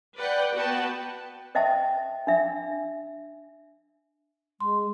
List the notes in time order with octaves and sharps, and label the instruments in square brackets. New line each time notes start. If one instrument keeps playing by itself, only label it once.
[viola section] B4 D5 F#5 G5
B3 F#4 B4 G5 A5
[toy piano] C5 D#5 E5 G5 A5
D4 E5
[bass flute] G#3 [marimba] C6